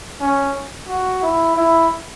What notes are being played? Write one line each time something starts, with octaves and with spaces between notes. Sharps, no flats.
C#4
F#4
E4
E4